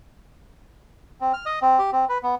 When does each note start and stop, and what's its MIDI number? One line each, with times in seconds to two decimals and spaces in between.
1.21 1.33 60
1.34 1.45 89
1.46 1.59 75
1.62 1.79 60
1.79 1.91 67
1.93 2.05 60
2.09 2.18 71
2.23 2.35 59